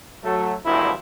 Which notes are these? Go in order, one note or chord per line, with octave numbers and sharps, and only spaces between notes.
F#3 A3
G#1 E2 G2 A#2 F3 E4